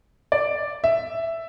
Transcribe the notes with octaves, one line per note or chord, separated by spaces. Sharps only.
D5
E5